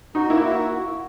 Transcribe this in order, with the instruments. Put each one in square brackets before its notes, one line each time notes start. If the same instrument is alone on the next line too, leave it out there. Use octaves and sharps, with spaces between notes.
[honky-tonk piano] D#4 [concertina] F#4
[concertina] A#3 [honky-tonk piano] E4
[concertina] F#4